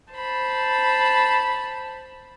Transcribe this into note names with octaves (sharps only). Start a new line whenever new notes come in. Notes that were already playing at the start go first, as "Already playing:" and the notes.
C5 A5 B5